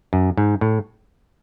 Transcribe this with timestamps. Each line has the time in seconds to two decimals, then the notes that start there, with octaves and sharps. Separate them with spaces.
0.13 F#2
0.37 G#2
0.61 A2